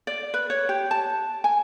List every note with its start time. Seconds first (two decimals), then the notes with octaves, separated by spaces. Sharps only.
0.07 D5
0.34 B4
0.50 C#5
0.69 G4
0.91 A5
1.44 G#5